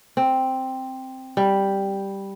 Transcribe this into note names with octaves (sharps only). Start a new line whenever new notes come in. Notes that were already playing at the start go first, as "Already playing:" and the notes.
C4
G3